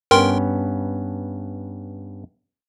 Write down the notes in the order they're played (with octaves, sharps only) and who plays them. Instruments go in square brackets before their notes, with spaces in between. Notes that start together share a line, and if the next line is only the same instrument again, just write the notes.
[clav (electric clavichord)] G2 B3 C#4 [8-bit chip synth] A#4 G5 C6